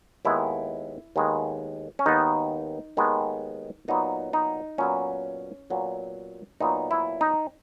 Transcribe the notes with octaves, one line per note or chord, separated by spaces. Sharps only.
D#2 D#3 G#3 B3 E4
D#2 D#3 G#3 B3
C#4
D#2 D#3 G#3 B3 D#4
D#2 D#3 G#3 B3
A#2 F#3 B3 D#4
D#4
A#2 F#3 B3 C#4
A#2 F#3 B3
A#2 F#3 B3 D#4
E4
D#4